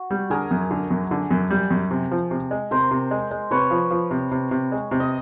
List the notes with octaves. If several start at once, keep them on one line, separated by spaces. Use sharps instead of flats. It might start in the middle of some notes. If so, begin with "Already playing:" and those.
Already playing: F#4
G3
D3 G#4 A#4
F#2
D3
F#2
D3
F#2
G3
F#2
C3
F3
C3
G#3
C3 A#4 C5
C3
G#3
G#3
C3 B4 C#5
F3
F3
C3
C3
C3
G#3
C3
D#5